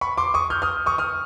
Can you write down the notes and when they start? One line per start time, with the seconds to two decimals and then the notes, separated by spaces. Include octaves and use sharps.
0.01 B5 C#6
0.17 C6 D6
0.34 C#6 D#6
0.50 F6 G6
0.62 D#6 F6
0.86 C#6 D#6
0.98 D#6 F6